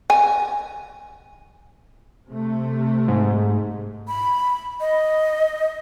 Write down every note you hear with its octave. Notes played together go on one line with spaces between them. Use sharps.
G#5
C3 A3
G#2
B5
D#5